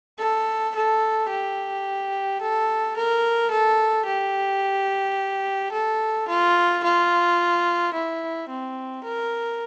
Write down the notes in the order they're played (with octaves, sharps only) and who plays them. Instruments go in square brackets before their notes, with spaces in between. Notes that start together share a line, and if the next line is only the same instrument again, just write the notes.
[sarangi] A4
A4
G4
A4
A#4
A4
G4
A4
F4
F4
E4
C4
A#4